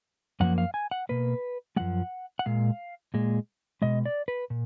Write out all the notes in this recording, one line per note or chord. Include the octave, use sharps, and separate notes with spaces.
F#2 F3 A#3 F#5
F5
G#5
F#5
B2 A#3 B4
F#2 F3 G#3 F#5
F#5
A#2 G#3 F5
A#2 G#3
B2 G#3 D#5
D5
B4
A#2